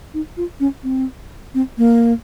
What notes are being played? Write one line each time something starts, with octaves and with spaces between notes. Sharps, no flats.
D#4
F4
C#4
C4
C4
A#3